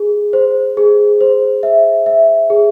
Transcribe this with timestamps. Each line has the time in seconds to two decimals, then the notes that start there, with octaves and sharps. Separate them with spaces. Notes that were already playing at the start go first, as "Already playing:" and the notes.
Already playing: G#4
0.33 C5
0.77 G#4
1.21 C5
1.63 E5
2.06 E5
2.50 G#4